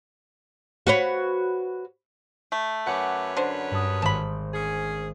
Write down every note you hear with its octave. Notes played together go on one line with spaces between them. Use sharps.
F#4 B4 C#5
A3
F#2 B4 C#5 F#5 G#5 D6
D3 C5
G2 A5 D#6
G#1 C5 A5 B5
C#4 G#4